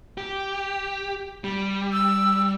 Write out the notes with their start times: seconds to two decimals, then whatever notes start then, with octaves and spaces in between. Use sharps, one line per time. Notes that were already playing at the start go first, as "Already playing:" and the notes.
0.18 G4
1.44 G3
1.93 E6